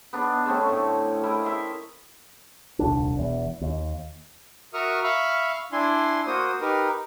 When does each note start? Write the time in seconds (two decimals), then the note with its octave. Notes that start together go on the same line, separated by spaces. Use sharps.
0.13 B3 D4 D#4
0.46 D3 A3 C4 C#4
0.69 A2
1.23 E4 A#4 D#5
1.45 A#4 E5 C6
2.79 D#1 C2 D4
3.17 E1 E2
3.61 D#2
4.74 F#4 A#4 E5 C#6 D#6 F6
5.03 E5 F5 B5 C#6 F6
5.72 D4 E4 G#5 C6
6.27 A#3 F#4 C5 D#6
6.61 D#4 G4 A#4 B4